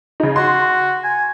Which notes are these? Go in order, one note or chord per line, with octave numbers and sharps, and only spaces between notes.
C#3 D#4
F#4 C6
G#5